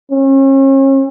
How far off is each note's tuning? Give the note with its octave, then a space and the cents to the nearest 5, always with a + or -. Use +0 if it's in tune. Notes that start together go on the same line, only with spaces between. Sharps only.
C#4 -40